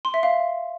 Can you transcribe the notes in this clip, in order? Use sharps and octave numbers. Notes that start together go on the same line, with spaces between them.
C6
E5
F5